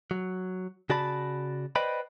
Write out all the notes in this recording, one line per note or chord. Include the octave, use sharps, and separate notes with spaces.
F#3
C#3 F#4 D5 A5 B5
B4 C5 D5 D#5 G5 B5